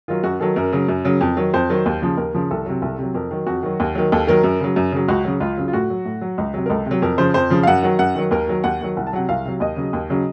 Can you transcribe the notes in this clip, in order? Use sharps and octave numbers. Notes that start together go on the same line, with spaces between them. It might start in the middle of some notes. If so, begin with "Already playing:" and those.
D#3 F#3 F4
F#2 F#4
D#3 F#3 A4
F#2 A#4
C#3 F#3
F#2
C#3 F#3
F2
D#3 F#3
F2 C5
D#3 F#3
D#2
C#3 F3
D#2 A#4
C#3 F3
C2 A4
C3 F#3
C2
C3 F#3
F2 A#4
D#3 F#3
F2 F#4
D#3 F#3
D#2
D#3 F#3
D#2 A4
D#3 F#3 A#4
F#2
C#3 F#3
F#2
C#3 F#3
C#2 F#4
C#3 F#3
C#2 F4
C#3 F#3
F4
A2 F#4
F#3
A2
F#3
C#2
C3 F#3
A#4
C#2 A4
C3 F#3
F2 A#4
C#3 F3 C5
F2 C5
C#3 F3
F5
F#2 F#5
D#3 F#3 F#5
F#2 F#5
D#3 F#3
D#2 A#4
D#3 F#3
D#2 F#5
D#3 F#3
C2 F#5
A5
C3 F#3 F#5
C2 F5
C3 F#3
D#2 D#5
C#3 F#3
D#2
C#3 F#3